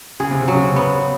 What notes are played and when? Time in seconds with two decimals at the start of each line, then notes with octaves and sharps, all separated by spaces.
0.20 C#3 G#4
0.31 C3
0.42 C#3
0.48 F#3
0.54 C#3
0.62 C3
0.76 B3